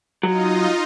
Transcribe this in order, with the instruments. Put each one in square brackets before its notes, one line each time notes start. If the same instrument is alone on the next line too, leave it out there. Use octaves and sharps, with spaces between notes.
[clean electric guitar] F#3 [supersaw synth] D#4 F4 D#5